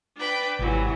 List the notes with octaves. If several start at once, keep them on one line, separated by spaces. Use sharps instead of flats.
D4 B4 G5
G#1 C3 E3 F#3